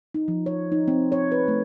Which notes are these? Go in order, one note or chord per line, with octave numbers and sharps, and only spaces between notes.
D#4
F3
C#5
D#4
C4
C#5
B4
A3